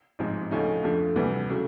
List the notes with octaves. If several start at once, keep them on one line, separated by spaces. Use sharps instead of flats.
A1 G#2 F3 G#3 C4
D2 C#3 F3 A3 C#4 D#4
F2 D3 F3 A3
D2 C3 E3 G3
C#3 F#3 A3